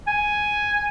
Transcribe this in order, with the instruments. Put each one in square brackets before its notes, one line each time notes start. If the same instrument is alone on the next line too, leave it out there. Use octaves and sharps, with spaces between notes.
[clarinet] G#5